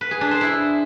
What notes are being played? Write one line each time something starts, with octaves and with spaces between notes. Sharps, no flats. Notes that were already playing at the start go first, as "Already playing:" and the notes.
B4
G#4
D4
C5
E4